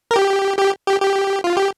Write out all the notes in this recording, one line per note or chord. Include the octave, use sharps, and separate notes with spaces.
A#4
G4
G4
G4
G4
F4
G4